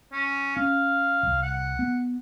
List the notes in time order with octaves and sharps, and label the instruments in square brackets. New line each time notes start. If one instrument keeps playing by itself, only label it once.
[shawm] C#4
[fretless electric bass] C#4 [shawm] F5
[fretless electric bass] E1 C2
[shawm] F#5
[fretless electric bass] B3